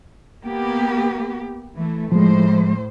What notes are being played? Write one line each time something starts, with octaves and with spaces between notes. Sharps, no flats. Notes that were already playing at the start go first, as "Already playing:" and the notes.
A#3 B3 G4
E3 A3
A2 F3 G#3 C5